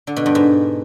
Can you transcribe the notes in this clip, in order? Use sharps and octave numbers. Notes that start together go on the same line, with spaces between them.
D3
B2
G2
G#2